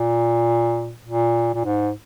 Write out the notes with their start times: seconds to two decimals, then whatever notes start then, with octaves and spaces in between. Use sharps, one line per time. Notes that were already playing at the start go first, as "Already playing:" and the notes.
Already playing: A#2
1.05 A#2
1.54 A#2
1.64 G#2